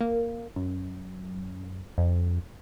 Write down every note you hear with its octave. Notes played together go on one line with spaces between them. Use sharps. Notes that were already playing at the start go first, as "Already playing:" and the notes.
A#3
F#2
F2